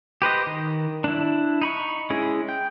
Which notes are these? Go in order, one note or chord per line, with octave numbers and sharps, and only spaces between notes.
G4 B4 C5 D#5
D#3
D4 E4
D#4 B5 C#6
G#3 C#4 E4 G#4
G5